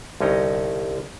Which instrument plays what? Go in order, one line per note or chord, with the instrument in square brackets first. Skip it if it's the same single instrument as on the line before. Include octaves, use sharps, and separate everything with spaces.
[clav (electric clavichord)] C2 D3 C#4 D#4 G5 A#5